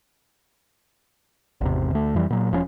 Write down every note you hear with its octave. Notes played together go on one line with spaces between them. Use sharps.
G#1 E2 C3
D2 A3
F2 E3 G3
A#2 F#3
E1 F3 G3 C#4